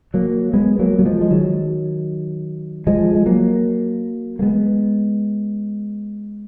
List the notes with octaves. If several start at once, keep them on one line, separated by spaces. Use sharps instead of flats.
F#3 A#3
G#3 B3
F#3 A#3
F#3
F3 G#3
G#3
D#3 F#3
F3 G#3
G#3
F#3 A#3
A#3
G#3 B3